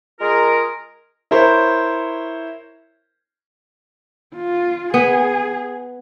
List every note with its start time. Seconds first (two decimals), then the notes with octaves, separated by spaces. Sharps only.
0.20 G#3 F4 G#4 A#4
1.31 E4 A#4 C5 C#5
4.36 F4
4.94 B3 G#4